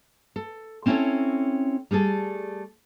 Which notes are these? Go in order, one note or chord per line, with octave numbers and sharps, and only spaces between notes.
A4
C4 C#4 E4 G#4 A4 C#5
G3 A3 G#4 A4